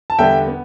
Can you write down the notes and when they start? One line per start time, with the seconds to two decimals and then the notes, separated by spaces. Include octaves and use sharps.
0.10 A5
0.18 E2 D3 G3 B3 E5 G5
0.48 B3